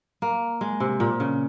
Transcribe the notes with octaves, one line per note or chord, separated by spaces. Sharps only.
A#3
G#3
C3
A#2
C#3